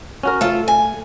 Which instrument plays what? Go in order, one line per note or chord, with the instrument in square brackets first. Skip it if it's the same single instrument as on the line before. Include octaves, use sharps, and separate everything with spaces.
[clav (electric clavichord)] C#4 F#4 A#4
[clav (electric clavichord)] A3 [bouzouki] F4 A4
[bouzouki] G#5